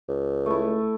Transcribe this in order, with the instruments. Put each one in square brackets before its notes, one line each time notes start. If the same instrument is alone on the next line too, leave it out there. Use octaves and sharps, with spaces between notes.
[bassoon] C#2
[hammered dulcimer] A3 E4